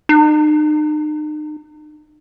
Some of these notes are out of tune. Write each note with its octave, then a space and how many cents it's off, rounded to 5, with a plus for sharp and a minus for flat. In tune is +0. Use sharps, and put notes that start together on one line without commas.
D#4 -40